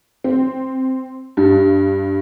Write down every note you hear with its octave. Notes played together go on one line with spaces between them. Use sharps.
C4
G2